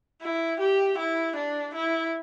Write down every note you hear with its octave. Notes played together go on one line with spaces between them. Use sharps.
E4
G4
E4
D4
E4